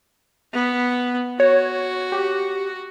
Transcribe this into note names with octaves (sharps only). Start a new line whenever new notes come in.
B3
F#4 C#5
G4